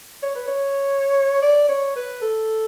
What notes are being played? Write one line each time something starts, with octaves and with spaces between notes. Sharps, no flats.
C#5
B4
C#5
D5
C#5
B4
A4